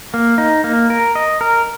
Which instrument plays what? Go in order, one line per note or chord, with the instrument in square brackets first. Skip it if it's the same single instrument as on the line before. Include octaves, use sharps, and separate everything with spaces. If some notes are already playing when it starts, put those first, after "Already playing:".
[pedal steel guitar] A#3
D#4
A#3
A#4
D#5
A#4